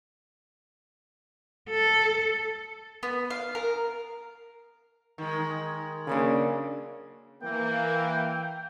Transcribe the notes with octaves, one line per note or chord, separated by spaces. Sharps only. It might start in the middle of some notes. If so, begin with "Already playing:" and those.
A4
B3
F5
A#4
D#3 G#3
C#3 F#3 A#3 D4
E3 A#3 G5